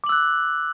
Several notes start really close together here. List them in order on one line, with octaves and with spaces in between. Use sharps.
D6 F#7 E6 F#6